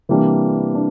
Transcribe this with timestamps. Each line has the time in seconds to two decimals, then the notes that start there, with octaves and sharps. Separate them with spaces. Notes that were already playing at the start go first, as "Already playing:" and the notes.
0.09 C3 E3 G3 A#3 D4
0.75 D4